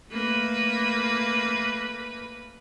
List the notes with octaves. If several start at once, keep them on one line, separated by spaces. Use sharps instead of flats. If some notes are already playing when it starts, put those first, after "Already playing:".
A3 A#3 B4